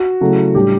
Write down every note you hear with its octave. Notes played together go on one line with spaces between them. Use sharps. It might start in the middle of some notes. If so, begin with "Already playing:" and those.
Already playing: F#4
C#3 F#3 A3 E4
A2 G3 D4 G4